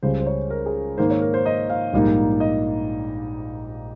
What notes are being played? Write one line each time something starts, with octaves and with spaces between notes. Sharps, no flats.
C#2 C#3 G3 C5
C5
C#5
A#4
G#4
G#2 D#3 A#3 C5
C#5
A#4
C5
D#5
F5
A#1 G#2 G3 A#3 D#4
D#5